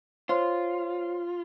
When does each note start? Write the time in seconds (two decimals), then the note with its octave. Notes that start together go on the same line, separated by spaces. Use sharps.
0.29 F4 C5 C#5 C6